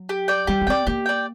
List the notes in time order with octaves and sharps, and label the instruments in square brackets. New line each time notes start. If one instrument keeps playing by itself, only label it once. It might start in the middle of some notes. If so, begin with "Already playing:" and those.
Already playing: [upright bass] F#3
[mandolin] G4
D5 G5
[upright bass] G3 [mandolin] G4
[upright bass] D4
[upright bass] C4 [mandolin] D5 G5
[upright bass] A#3 [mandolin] G4
[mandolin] D5 G5